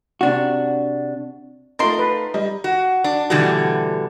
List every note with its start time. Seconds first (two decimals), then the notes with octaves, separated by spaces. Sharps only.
0.21 C3 D4 F#4
1.79 A3 D#4 F4 A#4 C6 A6
1.99 B4
2.34 G3 D#5
2.64 F#4
3.04 D4
3.30 B2 D3 E3 G3 A3 F#4